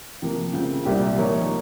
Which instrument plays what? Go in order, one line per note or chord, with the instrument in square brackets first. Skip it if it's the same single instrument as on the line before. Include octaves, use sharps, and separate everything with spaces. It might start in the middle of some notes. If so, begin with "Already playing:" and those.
[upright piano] C3 F3 A#3
C#3 G#3 C4 F4
C2 A#2 G3 C4 G4
F3 A#3 D#4 A#4 C#5